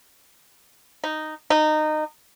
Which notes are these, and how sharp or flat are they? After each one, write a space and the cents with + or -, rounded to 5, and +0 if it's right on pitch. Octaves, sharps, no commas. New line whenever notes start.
D#4 -5
D#4 -20